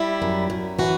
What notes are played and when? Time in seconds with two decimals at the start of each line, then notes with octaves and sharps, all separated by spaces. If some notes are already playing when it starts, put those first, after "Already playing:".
Already playing: G3 E4
0.22 F#2
0.50 F#2
0.79 E3 F#4